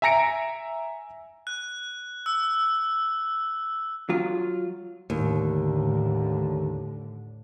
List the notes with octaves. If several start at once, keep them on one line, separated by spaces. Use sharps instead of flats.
E5 G#5 A#5 A#6 C#7 D7
F#6
E6
F#3 F4
D#2 A2 D3